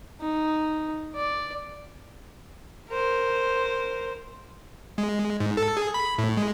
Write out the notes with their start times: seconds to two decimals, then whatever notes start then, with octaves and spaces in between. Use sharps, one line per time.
0.21 D#4
1.16 D5
2.90 A#4 C5
4.98 G#3
5.40 G#2
5.57 A4
5.77 G#4
5.94 B5
6.18 A2
6.37 G#3